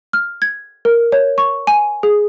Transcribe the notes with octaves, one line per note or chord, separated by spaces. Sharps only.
F6
G#6
A#4
C#5
C#6
G#5
G#4